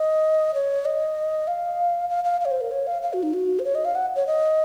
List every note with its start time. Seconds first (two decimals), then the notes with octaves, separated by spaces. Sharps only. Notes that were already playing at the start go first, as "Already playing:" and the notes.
Already playing: D#5
0.54 C#5
0.85 D#5
1.48 F5
2.10 F5
2.24 F5
2.41 F5
2.45 C#5
2.51 C5
2.61 A#4
2.71 C#5
2.87 F5
3.02 F5
3.13 F#4
3.23 D#4
3.34 F#4
3.59 C5
3.64 C#5
3.75 D#5
3.85 F5
3.95 F#5
4.16 C#5
4.27 D#5